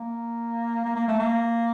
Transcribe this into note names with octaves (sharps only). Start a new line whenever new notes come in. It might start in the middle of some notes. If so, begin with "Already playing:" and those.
Already playing: A#3
A#3
A#3
A3
A#3